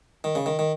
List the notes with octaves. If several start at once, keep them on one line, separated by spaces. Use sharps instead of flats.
D#3
C#3
D#3
D#3